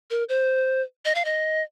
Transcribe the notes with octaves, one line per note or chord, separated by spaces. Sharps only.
A#4
C5
D#5
F5
D#5